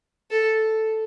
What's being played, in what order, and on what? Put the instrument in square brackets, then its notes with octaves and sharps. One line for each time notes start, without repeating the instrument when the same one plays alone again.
[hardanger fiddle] A4